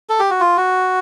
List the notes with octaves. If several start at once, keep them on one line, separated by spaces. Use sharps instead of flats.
A4
G4
F#4
F4
F#4